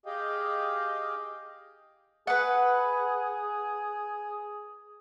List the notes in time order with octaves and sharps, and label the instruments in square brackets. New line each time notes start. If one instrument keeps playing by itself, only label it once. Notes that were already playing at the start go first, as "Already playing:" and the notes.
[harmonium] G4 G#4 D#5 F5 G5
[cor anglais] G#4 [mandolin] B4 F#5